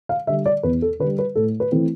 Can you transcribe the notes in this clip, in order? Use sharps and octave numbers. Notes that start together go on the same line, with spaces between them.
F5
D3 G3 E5
D5
E2 B4
A4
D3 G3 B4
B4
A2 A4
B4
E3 A3 C4 E4